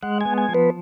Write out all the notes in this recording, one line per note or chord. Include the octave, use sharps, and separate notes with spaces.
G#3 F#5
B3 G#5
G#5
F3
B4